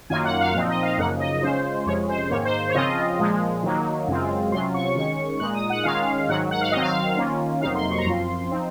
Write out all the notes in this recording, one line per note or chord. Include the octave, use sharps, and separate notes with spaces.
F#2 D#3 F#3 A#3 F4 G#5
F#5
F5
A#2 F3 C4 D#4 F5
D#5
F5
F#2 C#3 F3 A#3 D#4 F#5
D#5
C#3 G#3 C#4 F4 C5
F2 C3 F3 G#3 C#4 C#5
C5
G#2 D#3 A#3 C#5
C5
C#5
C#3 F3 C4 F4 D#5
A#2 F3 G#3
D#3 F#3 A#3 D#4
F#2 C#3 G#3 C4 F4
C3 F#3 C#4 F4 C6
C#6
D#3 G#3 C#4 C#6
A#2 G#3 D#4 F#6
D#6
F#5
D#3 G#3 C#4 F4 F5
G#2 D#3 F#3 F#5
F#5
F5
D#3 F#3 C4 D#5
F5
D#3 A#3 C#4 F4
F2 C3 F#3 A#3 D#4 F5
C6
C#6
A#5
F#2 F3 C4 F4 C6
F3 C4 D#4